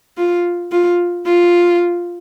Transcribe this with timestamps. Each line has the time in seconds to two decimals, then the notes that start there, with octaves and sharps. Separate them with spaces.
0.17 F4
0.72 F4
1.27 F4